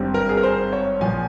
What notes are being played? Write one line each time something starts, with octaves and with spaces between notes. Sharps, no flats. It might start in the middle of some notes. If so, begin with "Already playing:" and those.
Already playing: G#1 G2 G3 C4
A#4
G#4
A#4
C5
C#5
A#1 A#2 F3 G#5